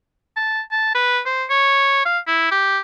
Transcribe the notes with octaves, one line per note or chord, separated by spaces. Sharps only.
A5
A5
B4
C5
C#5
F5
E4
G4